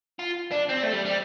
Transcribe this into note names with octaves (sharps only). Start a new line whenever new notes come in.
F4
D4
C4
A3
G3
G3